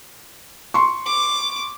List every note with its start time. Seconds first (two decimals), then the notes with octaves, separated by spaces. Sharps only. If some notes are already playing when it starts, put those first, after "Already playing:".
0.74 C6 C#6
1.05 D6